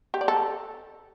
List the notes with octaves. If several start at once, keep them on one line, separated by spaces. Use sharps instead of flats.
G4
D5
A4